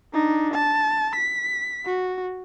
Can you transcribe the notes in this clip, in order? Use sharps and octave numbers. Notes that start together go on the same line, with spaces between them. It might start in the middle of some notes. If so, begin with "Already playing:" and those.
D4 D#4
A5
B6
F#4